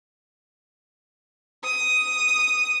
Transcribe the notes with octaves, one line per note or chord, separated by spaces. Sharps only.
D#6